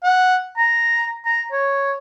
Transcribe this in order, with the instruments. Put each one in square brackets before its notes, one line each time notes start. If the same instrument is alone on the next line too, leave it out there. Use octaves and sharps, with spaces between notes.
[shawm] F#5
A#5
A#5
C#5